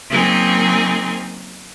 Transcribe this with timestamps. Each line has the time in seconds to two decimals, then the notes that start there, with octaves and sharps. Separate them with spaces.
0.11 C#3 F#3 A#3 C4 D#4 G#4